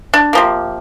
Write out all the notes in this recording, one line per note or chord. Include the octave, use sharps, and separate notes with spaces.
D4
C3 F3 A#3